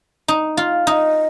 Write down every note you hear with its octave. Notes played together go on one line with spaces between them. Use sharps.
D#4
F4
D#4 D#5 F5